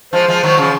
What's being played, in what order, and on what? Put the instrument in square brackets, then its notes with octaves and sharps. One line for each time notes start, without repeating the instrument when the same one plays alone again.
[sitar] F3 G#3 [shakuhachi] C5
[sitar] F3 G#3
D#3 F#3
C#3 F3